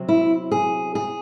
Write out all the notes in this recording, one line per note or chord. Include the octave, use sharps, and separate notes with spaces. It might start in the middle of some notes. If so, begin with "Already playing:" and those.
Already playing: C3 F#3 C4
E4
G#4
G#4